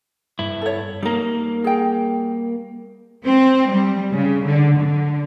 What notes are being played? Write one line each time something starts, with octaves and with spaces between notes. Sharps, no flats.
G2 E4
A4 C#5
G3 A#3 D#4 A#4
G#4 G5
C4
G3
C#3
D3
D3